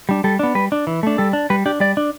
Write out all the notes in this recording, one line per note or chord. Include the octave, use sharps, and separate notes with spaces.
G3 D4
G3 A4
B3 D4
G3 B4
D4
E3
A3 D4
G3 A4
D4
G3 B4
D4 G4
G3 D5
D4